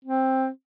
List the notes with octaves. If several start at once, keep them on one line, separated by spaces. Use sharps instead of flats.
C4